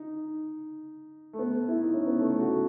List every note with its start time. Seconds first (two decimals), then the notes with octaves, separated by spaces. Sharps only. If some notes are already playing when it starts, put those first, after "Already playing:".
Already playing: D#4
1.33 A3
1.39 B3
1.68 E4
1.81 D#4
1.94 C#4
2.06 B3
2.19 A3
2.39 F#4